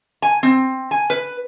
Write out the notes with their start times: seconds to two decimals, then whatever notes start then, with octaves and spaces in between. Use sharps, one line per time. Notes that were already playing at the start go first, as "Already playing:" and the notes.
0.22 G#5
0.43 C4
0.91 G#5
1.10 B4